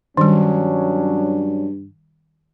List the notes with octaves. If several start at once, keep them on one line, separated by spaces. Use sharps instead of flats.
G2 D#3 F#3 G3 C#4 D4